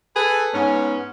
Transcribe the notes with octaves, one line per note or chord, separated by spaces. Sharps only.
G#4 A4 B4
G#2 B3 C#4